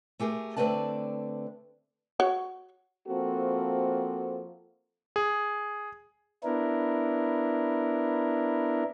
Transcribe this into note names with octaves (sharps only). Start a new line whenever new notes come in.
A3 G4 G#4 A#4
D3 A3 C4 B4 D5 A5
F#4 C#5 F#5
F3 A#3 C4 F#4 A4
G#4
B3 D4 E4 A#4